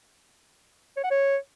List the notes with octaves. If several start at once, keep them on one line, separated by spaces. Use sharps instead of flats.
C#5
F#5
C#5